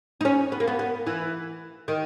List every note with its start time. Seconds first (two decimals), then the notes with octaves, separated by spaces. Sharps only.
0.21 D#4
0.25 C#4
0.52 B3
0.60 A#3
0.68 B3
0.79 B3
1.07 E3
1.88 D#3